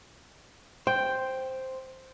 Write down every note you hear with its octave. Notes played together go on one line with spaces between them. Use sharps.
C5 G5